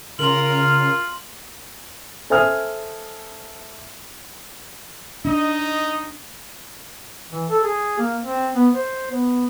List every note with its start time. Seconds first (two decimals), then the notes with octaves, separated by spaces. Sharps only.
0.19 C#3 F4 A#4 C6 F#7
2.30 A4 C5 E5 G#5 D#6 F6
5.25 D4 D#4 D#5
7.31 E3
7.49 A4
7.63 G#4
7.99 A#3
8.20 C4
8.55 B3
8.73 C5
9.11 B3